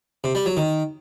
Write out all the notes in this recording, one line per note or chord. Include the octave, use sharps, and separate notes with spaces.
C3
G3
F#3
D#3